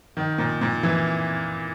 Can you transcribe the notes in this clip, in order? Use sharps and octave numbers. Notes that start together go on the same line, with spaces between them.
D#3
A#2
A#2
E3